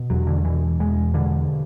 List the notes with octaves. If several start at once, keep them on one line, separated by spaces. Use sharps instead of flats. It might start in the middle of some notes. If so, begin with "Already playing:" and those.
Already playing: B2
E2 F#3
D3
B2 E3
E2 G#3
B2 D3